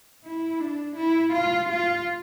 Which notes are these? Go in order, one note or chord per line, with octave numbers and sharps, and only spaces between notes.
E4
D4
E4
F4
F4